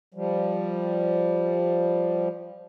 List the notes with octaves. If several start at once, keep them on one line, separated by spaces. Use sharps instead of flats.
F3 G3